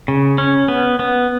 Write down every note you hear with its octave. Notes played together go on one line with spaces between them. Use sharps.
C#3
C#4
B3
B3